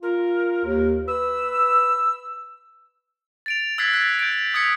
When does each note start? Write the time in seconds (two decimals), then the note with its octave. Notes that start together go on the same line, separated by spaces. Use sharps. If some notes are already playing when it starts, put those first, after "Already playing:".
0.02 F4 A#4
0.65 D#2
1.07 B4 E6
3.46 A6 D7 F7
3.78 E6 F#6 G#6 A6 B6 C7
3.93 F#6 B6
4.19 G6 D7
4.54 D#6 G#6 B6 C#7